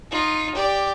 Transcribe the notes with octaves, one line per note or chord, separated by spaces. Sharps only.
D#4 F4
G4 D5